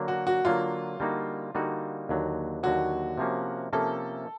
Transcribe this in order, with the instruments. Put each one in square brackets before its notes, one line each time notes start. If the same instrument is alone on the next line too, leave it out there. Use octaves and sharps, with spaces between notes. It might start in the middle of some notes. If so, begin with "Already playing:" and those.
Already playing: [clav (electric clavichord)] D3 F#3 A#3
[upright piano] F#4
F#4
[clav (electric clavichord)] D3 F#3 A#3 [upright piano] F4
[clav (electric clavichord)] D3 G3 A#3 D#4 F#4
D3 G3 A#3 D#4 F#4
D#2 D3 F#3
[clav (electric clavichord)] D#2 D3 F#3 [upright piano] F#4
[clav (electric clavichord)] C3 F3 A#3 C#4
[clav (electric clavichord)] C3 F3 A#3 C#4 [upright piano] A4